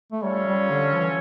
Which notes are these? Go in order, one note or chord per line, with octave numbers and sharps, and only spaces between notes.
A3
G3 C#4 F4 A4 C#5
G3
D3
F3
E3